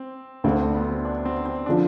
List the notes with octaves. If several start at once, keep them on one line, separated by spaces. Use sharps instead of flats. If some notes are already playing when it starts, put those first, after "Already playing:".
Already playing: C4
D2 D3 A3 C4
C4
B3
C4
D4
C4
C4
D4
D3 F3